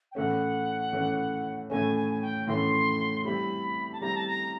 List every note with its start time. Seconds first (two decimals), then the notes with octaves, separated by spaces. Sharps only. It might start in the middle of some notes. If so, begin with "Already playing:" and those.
0.12 G5
0.15 A2 E3 A3 C#4 F#5
0.93 A2 E3 A3 C#4
1.70 A2 E3 A3 C#4 G#5
1.96 G#5
2.10 G#5
2.22 G5
2.47 A2 E3 A3 C#4 C6
3.24 G3 C4 E4 G4 B5
3.92 A5
4.01 G3 C4 E4 G4 A#5
4.15 A5
4.27 A#5